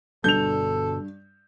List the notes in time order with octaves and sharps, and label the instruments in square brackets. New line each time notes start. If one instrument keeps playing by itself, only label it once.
[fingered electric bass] G1 B2 D4 [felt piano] G2 [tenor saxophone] A4 [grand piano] G6 F7